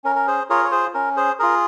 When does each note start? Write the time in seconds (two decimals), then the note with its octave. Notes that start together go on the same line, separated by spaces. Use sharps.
0.04 C#4 A#4
0.16 A#4
0.27 G#4 C5
0.49 F4 G#4 A#4 C#5
0.65 C#5
0.72 G#4 C5
0.94 C#4 A#4
1.17 G#4 C5
1.39 F4 G#4 A#4